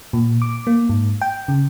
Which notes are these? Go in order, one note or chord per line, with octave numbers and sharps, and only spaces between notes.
A#2
D6
A#3
G#2
G5
C#3